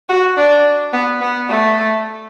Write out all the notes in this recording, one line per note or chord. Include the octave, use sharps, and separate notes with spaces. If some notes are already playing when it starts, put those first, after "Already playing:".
F#4
D4
B3
B3
A3